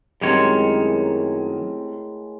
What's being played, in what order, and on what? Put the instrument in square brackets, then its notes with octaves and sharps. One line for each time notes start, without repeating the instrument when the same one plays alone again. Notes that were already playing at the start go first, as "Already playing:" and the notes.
[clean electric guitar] F#2 D#3 C#5 [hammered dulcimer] A2 G#3 A#4 [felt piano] G3 C4